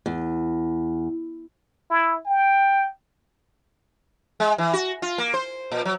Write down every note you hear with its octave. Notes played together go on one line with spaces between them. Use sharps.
E2
E4
G5
G#3
E3
F#4
F4
A#3
C5
A#2
F#3